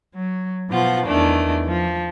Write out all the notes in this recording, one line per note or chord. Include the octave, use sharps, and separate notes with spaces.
F#3
B2 F3 F4 F#5
E2 D#3 A3 D4
F3